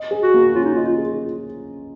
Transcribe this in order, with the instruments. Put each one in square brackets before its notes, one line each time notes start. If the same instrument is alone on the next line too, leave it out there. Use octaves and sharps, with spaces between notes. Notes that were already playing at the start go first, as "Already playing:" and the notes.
Already playing: [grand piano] D#5
G#4
[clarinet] F#4
[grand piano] A#3
[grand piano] C#4 [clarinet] F4
[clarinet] D#4
[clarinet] F4 [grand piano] D#5
[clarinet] F4
[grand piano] G#4